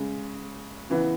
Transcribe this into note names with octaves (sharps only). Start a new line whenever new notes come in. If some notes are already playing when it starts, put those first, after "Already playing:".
Already playing: C#3 G#3
C#3 E3 B3